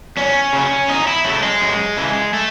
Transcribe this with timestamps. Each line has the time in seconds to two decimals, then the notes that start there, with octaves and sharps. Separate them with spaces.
0.17 E2 C#4
0.53 C#3 F#3
0.88 E2 D#4
1.07 E4
1.25 C#3 F#3 A3
1.43 G#3
1.61 F#2
1.97 C#3 E3
2.34 A3